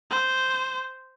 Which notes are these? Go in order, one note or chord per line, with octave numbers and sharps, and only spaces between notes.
C5